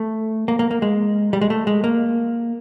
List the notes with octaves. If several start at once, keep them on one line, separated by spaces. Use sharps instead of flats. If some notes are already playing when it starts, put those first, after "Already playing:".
Already playing: A3
A#3
A#3
A#3
G#3
G3
G#3
A3
G#3
A#3